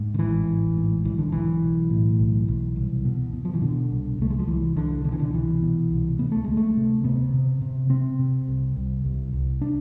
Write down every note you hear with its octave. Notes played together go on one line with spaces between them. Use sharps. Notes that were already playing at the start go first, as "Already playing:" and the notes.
Already playing: G#2
D3
A1 E3
A1
G#2
B1 E3
D3
B1 E3
B1
A2
B1
B1
C2
B2
B2
F3
E3
B2 D3
C2
C2 A3
G#3
F3
C2 E3
C2 D3
B2 D3
E3
D3
C2 E3
B2
C2
D2 B3
A3
D2 G#3
A3
C3
C3 B3
C3
C3
C3 C4
C3
C2
C2
C2
C2
D4